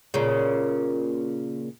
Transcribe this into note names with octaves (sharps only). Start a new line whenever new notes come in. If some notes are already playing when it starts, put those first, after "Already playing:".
A#2 C#3